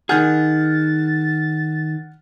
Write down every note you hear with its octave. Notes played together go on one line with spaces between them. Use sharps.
D#3 G#4 F#5 F6 G6 A6